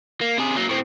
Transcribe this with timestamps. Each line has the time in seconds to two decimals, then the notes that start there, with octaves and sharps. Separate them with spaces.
0.21 A#3
0.38 C3 G#4
0.56 F#3 A#3
0.69 A2 C4